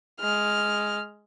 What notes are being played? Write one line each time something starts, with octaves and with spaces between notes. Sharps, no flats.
G#3 F6